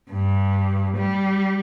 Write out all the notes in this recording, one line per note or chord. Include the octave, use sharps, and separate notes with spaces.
G2
G3